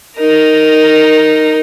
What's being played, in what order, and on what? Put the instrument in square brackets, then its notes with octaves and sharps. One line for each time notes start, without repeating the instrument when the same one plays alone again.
[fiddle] D#4 A#4